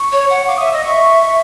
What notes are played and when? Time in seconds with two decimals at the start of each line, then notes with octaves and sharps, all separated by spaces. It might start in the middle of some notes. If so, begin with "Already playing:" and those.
Already playing: C#6
0.12 C#5
0.30 F#5
0.48 F5 D6
0.58 E5 D#6
0.67 E6
0.73 D#5 D#6
0.85 E5 C#6